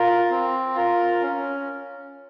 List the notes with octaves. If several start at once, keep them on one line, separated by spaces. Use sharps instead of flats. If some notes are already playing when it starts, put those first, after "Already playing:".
Already playing: F4 A#4
C4
F4 A#4
C#4